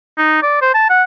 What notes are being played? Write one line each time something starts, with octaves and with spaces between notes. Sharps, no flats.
D#4
D5
C5
A5
F#5